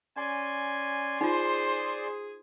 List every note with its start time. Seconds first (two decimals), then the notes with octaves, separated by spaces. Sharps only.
0.17 C#4 D5 G#5 C6
1.21 D#4 F4 G#4 C5